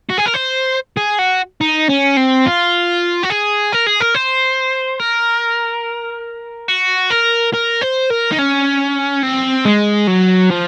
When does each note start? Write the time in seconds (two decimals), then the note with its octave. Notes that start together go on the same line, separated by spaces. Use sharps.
0.09 F#4
0.17 G#4
0.26 A#4
0.34 C5
0.97 G#4
1.19 F#4
1.61 D#4
1.89 C#4
2.17 C4
2.46 F4
3.23 F#4
3.30 G#4
3.73 A#4
3.87 G#4
4.00 A#4
4.15 C5
4.99 A#4
6.68 F#4
7.10 A#4
7.53 A#4
7.81 C5
8.10 A#4
8.31 D#4
8.38 C#4
9.23 C4
9.65 G#3
10.07 F#3
10.50 F3